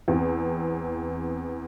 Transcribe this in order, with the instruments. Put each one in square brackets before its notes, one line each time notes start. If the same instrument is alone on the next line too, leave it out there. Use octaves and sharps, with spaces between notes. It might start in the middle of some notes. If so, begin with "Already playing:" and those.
[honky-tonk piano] E2 C4